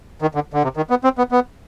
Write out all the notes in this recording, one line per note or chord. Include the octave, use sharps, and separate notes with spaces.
D#3
D3
D3
C3
D#3
B3
C4
B3
B3